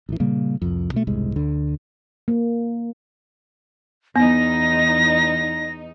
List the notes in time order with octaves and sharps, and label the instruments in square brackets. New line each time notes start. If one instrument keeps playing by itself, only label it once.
[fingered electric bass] A1 E3
A#2 C#3 G3 A#3
C2 F2
B2 A3
E1 C2 G#2 G#3
D2 D3
[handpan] A#3
[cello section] E2 D#4 [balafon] B3 [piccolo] A#6